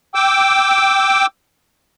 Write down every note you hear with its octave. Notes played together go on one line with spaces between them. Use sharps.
G5 D6 E6